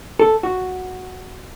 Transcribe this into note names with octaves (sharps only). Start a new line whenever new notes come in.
A4
F#4